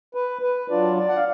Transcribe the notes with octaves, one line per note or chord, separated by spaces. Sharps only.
B4
B4
F#3 D4 F4 D5
D5
F#5
F5